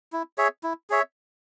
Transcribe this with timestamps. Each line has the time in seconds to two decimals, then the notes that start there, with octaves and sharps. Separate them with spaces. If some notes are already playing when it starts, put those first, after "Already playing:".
0.12 E4
0.38 G#4 C#5 E5
0.63 E4
0.90 G#4 C#5 E5